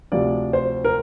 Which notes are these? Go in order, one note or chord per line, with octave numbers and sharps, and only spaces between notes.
D2 C3 F3 D5
C5
A#4